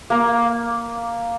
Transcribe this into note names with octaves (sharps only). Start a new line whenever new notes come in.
A#3